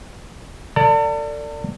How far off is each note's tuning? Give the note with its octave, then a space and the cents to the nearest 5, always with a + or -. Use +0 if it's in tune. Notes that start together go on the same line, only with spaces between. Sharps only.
A4 +40 D5 +0 A5 +40